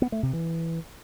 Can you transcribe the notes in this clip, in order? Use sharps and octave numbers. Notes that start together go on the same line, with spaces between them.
B3
A3
C3
E3